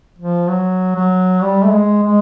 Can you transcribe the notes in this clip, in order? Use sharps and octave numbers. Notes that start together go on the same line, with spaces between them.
F3
F#3
F#3
G3
A3
G#3
G#3